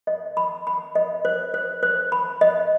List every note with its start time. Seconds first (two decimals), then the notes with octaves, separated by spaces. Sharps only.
0.07 D#5
0.37 B5
0.67 B5
0.95 D#5
1.25 C5
1.54 C5
1.83 C5
2.12 B5
2.41 D#5